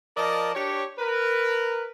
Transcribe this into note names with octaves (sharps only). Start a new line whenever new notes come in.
F3 A#4 D5 D#5 A5
D4 G4 C#5
A#4 B4